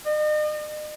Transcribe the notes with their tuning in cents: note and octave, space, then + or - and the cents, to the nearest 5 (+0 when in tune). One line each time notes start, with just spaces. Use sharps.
D#5 -40